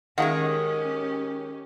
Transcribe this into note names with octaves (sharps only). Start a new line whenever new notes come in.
D#3 G#3 C#4 G4 A4 F5 F#5